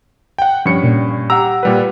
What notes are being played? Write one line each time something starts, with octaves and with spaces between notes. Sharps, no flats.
F#5 G5
G2 F3 C#4 C#7
A#2
G4 F#5 A#5 E6
A#2 G3 B4